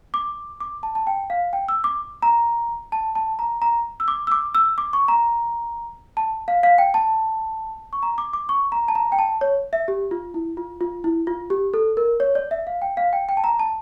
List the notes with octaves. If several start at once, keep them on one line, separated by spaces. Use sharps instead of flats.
D6
D6
A5
A5
G5
F5
G5
E6
D6
A#5
A5
A5
A#5
A#5
E6
D6
E6
D6
E6
D6
C#6
A#5
A5
F5
F5
G5
A5
C#6
A#5
D6
D6
C#6
A#5
A5
A#5
G5
A5
C#5
E5
G4
F4
E4
F4
F4
E4
F4
G4
A4
A#4
C#5
D5
E5
F5
G5
F5
G5
G5
A5
A#5
A5